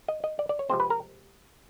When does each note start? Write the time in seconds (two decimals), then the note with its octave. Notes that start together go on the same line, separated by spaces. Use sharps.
0.08 D#5
0.24 D#5
0.39 D5
0.49 D5
0.59 C#5
0.70 C3 F3 G#3 C4 C5
0.80 B4
0.90 A#4